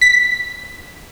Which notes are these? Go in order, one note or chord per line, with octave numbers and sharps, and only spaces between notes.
B6